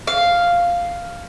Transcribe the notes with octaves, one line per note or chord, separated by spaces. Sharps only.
F5